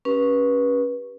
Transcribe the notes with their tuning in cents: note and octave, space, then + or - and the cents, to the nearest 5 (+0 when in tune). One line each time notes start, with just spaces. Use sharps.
C#4 +0 G4 +0 B4 -25